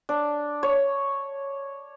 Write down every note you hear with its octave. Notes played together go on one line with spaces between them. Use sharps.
D4
C#5